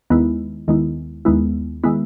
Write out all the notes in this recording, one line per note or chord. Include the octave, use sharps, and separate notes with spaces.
D#2 D#3 G#3 B3 E4
D#2 D#3 G#3 B3 E4
D#2 D#3 G#3 B3 E4
D#3 G#3 B3 E4